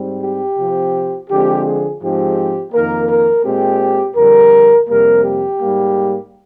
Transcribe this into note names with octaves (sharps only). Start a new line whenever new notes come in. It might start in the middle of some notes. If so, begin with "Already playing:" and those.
Already playing: G#2 G3 C4
G4
C3 F3 C4
D3 F3 G#3 C4 G4
G#4
G#2 F3 G#3 C4 G4
F2 D#3 A#3 A#4
A#4
A#2 G#3 C4 G4
F2 D3 G3 A#4
F2 C3 G3 A#3 A#4
G4
G#2 G3 A#3